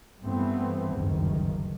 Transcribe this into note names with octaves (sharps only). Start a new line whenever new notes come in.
G2 E3 A3 B3 C4
F#1 D2 G2 D#3